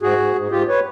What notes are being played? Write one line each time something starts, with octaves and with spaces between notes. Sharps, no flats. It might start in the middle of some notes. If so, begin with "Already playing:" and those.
G#2 F#4 G#4
G#2
G#2
G#2 F4 G4
B4 C#5